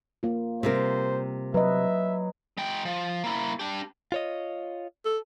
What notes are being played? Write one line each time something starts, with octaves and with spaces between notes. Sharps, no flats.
A#3 F4
C3 G3 A#4 C5
F#3 B4 D#5 E5
G#3 G5
F3
A#3 E4
D4 G4
F4 C#5 D#5
A4